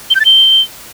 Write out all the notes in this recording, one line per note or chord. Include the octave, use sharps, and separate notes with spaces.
G7
G6
A6
G7